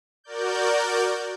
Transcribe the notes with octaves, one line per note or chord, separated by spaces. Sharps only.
F#4 A#4 D5 G6